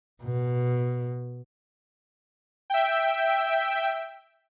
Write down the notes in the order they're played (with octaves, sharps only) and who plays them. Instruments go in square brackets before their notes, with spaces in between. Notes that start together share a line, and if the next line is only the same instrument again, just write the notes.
[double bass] B2
[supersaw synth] E5 G5